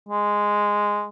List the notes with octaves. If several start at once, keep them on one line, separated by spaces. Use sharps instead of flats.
G#3